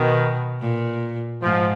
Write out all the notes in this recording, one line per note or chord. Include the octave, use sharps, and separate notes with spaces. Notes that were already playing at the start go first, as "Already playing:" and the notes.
Already playing: B2 D#3
A#2
G#2 F3